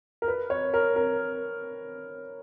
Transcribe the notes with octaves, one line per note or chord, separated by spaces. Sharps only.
A#4
B4
C#5
A#4
A#4